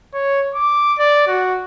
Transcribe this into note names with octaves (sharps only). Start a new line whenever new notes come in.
C#5
D6
D5
F#4